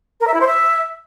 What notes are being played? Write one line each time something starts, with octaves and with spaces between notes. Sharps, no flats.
A#4
E5
E4
C5
E5